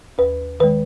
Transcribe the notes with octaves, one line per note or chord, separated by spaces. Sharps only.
D#2 B4
D#3 G#3 B4